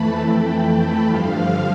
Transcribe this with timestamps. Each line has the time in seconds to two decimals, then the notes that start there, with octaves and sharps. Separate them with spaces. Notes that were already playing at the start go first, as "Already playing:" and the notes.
Already playing: F2 E3 A3 A5 B5
0.14 G5
1.04 G2 D3 F3 F5